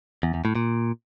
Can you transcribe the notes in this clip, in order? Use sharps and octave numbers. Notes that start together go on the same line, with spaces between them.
E2
E2
A2
A#2